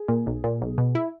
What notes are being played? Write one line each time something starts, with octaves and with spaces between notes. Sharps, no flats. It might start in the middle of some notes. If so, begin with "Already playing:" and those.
Already playing: G#4
A#2
B1
A#2
B1
B2
E4